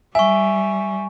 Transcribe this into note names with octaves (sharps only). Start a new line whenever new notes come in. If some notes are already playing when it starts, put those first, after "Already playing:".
G3 E5 G#5 C#6